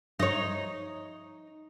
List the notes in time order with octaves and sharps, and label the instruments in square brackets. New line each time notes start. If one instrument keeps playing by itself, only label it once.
[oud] D#4 C#5